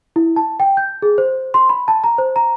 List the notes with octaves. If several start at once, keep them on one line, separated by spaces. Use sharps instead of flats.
E4
A5
G5
G6
G#4
C5
C6
B5
A5
A#5
C5
A#5